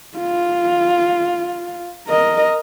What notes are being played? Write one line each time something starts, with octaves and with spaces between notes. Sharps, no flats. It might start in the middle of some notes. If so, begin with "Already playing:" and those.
F4
A#4 D#5